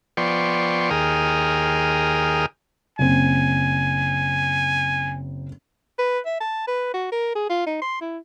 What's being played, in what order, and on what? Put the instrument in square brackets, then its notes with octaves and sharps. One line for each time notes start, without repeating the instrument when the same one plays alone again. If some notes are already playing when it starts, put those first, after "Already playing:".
[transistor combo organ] F3 B3 D5 G5 C6 C#6
D#2 G#4 A#4 G5 D#6 F6
[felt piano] F#1 C4 [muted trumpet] G#5
[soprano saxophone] B4
E5
A5
B4
F#4
A#4
G#4
F4
D#4
C6
E4